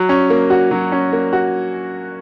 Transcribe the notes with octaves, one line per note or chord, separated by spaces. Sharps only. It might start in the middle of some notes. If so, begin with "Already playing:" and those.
Already playing: F#3
C#4
A#3
F#4
F#3
C#4
A#3
F#4